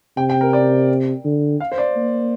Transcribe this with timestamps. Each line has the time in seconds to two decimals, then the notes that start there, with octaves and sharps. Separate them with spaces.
0.17 C3 G5
0.30 G5
0.41 A#4
0.53 D5
1.25 D3
1.60 F5
1.72 C5
1.78 D5
1.96 A#3